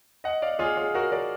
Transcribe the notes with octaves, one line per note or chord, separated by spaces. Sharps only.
D#5 F#5
D5 F5
F4 G#4
F4 G#4
F#4 A#4
A#4 D5